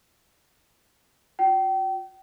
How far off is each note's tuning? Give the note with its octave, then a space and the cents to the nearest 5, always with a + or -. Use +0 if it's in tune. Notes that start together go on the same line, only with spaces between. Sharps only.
F4 +45 G5 -35